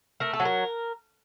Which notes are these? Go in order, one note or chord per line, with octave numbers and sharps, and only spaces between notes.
A3 A#4
A4
F#3
A#4